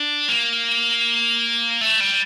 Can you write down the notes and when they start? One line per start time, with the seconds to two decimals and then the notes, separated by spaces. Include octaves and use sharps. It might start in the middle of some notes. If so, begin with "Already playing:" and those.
Already playing: D4
0.29 A#3
1.81 A3
2.00 G3